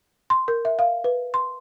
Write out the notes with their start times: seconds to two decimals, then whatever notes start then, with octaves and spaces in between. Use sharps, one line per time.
0.30 C6
0.48 A#4
0.65 E5
0.79 F5
1.04 B4
1.34 C6